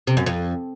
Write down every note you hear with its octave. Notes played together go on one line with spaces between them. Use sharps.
C3
F#2
F2